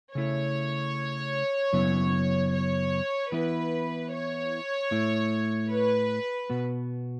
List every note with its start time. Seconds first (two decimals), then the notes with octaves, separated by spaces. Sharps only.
0.14 C#3 A3 E4 C#5
1.73 F#2 C#3 F#3 B3 E4
2.52 C#5
3.32 E3 B3 E4 B4
4.12 C#5
4.91 A2 A3 E4
5.70 B4
6.50 B2 B3 F#4